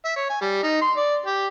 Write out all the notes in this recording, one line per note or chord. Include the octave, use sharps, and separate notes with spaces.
E5
C#5
G#5
G3
D#4
C6
D5
G4